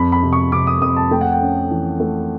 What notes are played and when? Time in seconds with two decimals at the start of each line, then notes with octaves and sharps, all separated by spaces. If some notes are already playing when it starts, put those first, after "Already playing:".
Already playing: F2 B5
0.12 B5
0.23 C3
0.33 C#6
0.52 C3 D6
0.67 D#6
0.82 F2 D#6
0.96 A5
1.11 A3 G5
1.21 F#5
1.32 G5
1.41 C#4
1.71 E3
2.00 A3